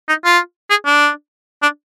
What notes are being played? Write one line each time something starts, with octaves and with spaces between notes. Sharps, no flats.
D#4
F4
G#4
D4
D4